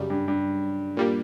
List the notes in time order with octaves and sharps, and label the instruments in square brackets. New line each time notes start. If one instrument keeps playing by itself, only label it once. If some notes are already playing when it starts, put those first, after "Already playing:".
Already playing: [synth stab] F#2 C#3 G3
[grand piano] G2
G2
[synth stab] A#2 G3 A#3